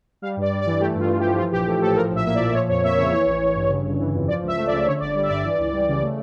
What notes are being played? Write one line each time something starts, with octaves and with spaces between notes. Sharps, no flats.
G3 F5
G2
D5
G2
D5
E3
A3 G4
G2 F4
G2
G4
F3
E3 F4
A#1 G4
A3
A2 A4
F3 A#4
A#1 E5
A#3 E5
D5
A#2
F3 C#5
F2 C#5
A#3 E5
C#3 C#5
E3 C#5
A1
A1
G2
C#3
G1
E3
F2
F3 D5
C#2
E5
A3
D5
C#3
D3 C#5
G1 D5
G3 D5
E5
G2 D5
E3
C#2
G3
C#3
A3